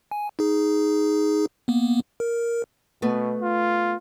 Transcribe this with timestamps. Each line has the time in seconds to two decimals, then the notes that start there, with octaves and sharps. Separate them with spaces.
0.11 G#5
0.39 D#4 G#4
1.68 A#3 B3
2.20 A#4
3.02 B2 A3 B3
3.42 F4